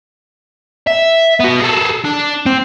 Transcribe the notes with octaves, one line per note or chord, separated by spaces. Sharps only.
E5
B3 F#4
G#4 A4
D4
C4